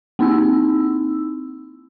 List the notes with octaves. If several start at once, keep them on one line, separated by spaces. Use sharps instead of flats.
A#3 C4 D#4 E4 E6